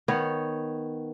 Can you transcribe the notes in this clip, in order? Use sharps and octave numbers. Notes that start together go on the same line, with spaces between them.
D#3 B3 C#5